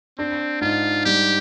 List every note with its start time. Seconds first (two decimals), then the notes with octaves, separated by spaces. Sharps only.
0.18 C4 D4
0.61 G#2 F4
1.05 G3 G4